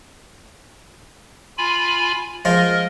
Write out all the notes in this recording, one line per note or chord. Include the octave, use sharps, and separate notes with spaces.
F4 G#5 B5
F3 G#3 F4 A#4 D#5